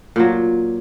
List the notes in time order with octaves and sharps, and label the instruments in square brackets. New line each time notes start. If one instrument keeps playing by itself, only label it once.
[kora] A#2 F#3